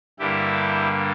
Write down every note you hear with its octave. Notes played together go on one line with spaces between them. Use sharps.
G2 D3 G3 A#3 E4 G4